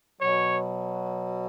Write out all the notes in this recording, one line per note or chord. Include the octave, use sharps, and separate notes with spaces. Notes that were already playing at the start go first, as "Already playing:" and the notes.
B2 F#3 C#5